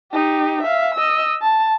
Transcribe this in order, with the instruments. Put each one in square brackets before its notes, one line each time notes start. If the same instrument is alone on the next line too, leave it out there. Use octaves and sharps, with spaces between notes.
[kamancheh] D#4 G4
E5 F5
D#5 E6
A5